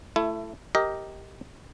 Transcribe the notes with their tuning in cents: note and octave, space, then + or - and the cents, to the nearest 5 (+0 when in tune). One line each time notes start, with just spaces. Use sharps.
A3 +5 E4 +25
G4 +0 A#4 +0 D#5 +15